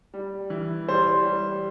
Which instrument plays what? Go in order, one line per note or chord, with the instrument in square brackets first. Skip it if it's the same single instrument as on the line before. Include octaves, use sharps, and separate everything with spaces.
[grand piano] G3
E3
[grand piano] G3 [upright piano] C5
[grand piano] G3